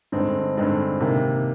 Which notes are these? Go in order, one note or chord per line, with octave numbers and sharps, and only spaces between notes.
G2 D3 G#3 C4 D#4
G2 D3 G#3 C4 D#4
C3 D#3 A#3